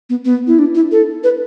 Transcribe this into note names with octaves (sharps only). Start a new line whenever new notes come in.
B3
B3
E4
D4
E4
A4
B4